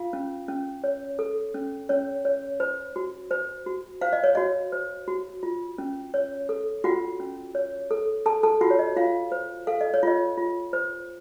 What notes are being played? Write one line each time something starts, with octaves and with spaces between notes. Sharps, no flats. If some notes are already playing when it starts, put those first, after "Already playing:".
Already playing: F4 F5
C#4
C#4
C#5
A4
C#4
C#4 C#5
C#5
C5
F#4
C5
F#4
C5 F5
D#5
C#5
F#4 D#5
C5
F#4
F4
C#4
C#5
A4
F4 F#4 F#5
C#4
C#5
A4
A4 A5
A4 A5
F4 F#4 F#5
C#5
D#5
F4 F5
C5
A4 F5
D#5
C#5
F4 D#5
F4
C5